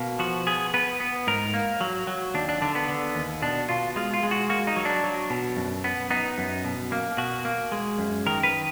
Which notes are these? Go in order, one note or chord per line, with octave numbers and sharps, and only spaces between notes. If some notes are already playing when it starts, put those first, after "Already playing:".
Already playing: B2 A#3
F3 F#4
B3 G#4
B3 B4
B3
G#2 A#4
A#3
F#3
F#3
D#2 D4
D4
D3 D4
B3
D3
D#2
B2 D4
B2 F4
G#3 F4
F4
G#3
F#4
A#3 F#4
D#4
F#3
D4
F#3
B2
F#2
B3
B3 D#4
F#2
B2
A#3
B2 F#4
A#3
G#3
F#2
D#3 A#4
B4